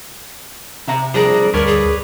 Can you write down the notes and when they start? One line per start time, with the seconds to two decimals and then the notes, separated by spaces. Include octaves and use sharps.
0.88 C3 E5 A#5
1.14 F3 G3 C4 D4 G#4 A#4
1.54 D2 G2 A#4 B4 C#5 D5
1.67 G#4